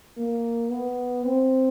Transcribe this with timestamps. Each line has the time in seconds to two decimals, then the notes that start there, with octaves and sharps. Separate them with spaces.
0.17 A#3
0.71 B3
1.25 C4